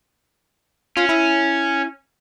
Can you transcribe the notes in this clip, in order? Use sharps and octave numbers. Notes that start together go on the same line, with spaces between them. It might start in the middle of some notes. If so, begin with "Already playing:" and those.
C#4 F4
E4